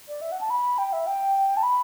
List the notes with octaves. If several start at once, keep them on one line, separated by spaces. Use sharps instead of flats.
D5
E5
F#5
A5
B5
G5
E5
G5
A5
B5